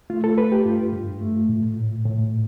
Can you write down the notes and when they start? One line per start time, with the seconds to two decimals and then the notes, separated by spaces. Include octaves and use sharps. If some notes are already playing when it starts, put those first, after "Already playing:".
0.10 A3 F4
0.24 A4
0.38 A3 B4
0.52 G4
0.65 G2 F4
0.93 G2
1.21 A3
1.49 A2
1.77 A2
2.05 A2